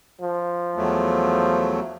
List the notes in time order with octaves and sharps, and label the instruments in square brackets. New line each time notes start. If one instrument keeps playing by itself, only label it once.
[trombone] F3
[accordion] E2 F#3 A3